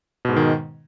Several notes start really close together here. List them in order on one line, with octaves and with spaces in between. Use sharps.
B2 G#2 G#3 D#3